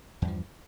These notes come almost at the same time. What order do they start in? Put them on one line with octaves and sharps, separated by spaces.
E2 G2 F3